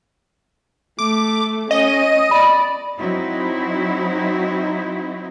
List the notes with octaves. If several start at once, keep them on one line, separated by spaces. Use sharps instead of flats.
A3 D6
C#4 D#5
D5 B5
F#3 C4 D#4 E4 F#4